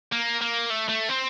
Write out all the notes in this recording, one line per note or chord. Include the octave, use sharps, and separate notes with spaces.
A#3
A#3
A3
A3
C4